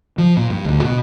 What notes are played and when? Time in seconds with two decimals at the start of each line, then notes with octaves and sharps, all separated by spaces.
0.18 F3
0.37 A#2
0.50 G2
0.65 D2
0.84 B2